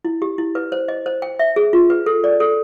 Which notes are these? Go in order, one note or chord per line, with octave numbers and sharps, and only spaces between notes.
E4
G4
E4
B4
C5
D#5
C5
G5
E5
G#4
F4
B4
A4
D5
A4